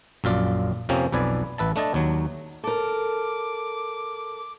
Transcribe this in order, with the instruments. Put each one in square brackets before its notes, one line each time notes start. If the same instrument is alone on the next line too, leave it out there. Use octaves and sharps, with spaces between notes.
[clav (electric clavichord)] A#1 F#2 F4 D5
F2 C3 F3 A#3 C4 C#4
B1 F2 B4 D5 G#5
A1 B4 E5 A5
A3 D4 D#5 A5
D#2 F#3
[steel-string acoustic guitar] A4 A#4 [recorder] D6